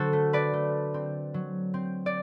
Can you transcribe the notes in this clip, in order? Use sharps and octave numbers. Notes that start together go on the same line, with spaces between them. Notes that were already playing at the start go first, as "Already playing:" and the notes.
Already playing: D3 F#3 F#4 A4 C5
A3
B4 D5
A3
C4
F#3
C4
D5